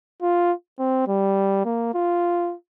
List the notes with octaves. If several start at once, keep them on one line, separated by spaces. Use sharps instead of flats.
F4
C4
G3
A#3
F4